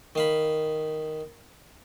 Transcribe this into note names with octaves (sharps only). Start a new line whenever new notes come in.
D#3 F5 B5